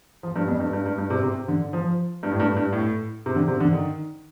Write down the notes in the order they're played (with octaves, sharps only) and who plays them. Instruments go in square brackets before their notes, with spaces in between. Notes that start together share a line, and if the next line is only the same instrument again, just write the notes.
[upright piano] F3
G2
F2
G2
G2
G2
G2
C3
C3
D3
F3
G2
A2
G2
G2
A2
C3
D3
C3
D3
D#3